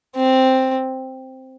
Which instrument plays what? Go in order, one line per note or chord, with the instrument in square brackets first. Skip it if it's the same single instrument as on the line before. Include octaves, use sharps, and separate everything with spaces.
[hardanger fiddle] C4